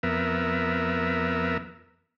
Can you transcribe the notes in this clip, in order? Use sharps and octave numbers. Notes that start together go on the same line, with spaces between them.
F2 B3 A#4 E5